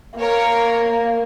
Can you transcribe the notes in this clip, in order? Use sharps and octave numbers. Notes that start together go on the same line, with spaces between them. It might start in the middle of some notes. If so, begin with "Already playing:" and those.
A#3 A#4 C#5